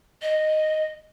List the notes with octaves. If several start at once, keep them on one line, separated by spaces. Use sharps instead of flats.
D#5